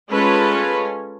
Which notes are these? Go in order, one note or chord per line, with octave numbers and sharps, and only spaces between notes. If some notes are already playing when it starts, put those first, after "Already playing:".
G#3 C#4 F4 A4 B4